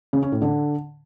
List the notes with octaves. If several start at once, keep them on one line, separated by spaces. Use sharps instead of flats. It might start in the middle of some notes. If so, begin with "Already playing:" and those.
C#3
C#4
A2
D3